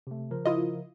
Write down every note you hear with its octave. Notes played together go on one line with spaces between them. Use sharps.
C3 A3
C#3 F3 A#4
E4 F4 D#5